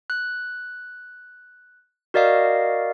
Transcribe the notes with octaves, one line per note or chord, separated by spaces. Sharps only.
F#6
F#4 A#4 D5 D#5 F5